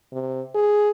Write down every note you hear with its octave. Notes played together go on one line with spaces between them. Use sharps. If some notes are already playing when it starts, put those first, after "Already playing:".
C3
G#4